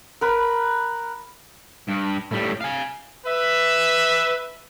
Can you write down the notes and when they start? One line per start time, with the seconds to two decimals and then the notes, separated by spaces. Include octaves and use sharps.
0.21 A#4 B4 B5
1.88 G2
2.32 A2 G3
2.61 F5 G#5
3.27 B4 E5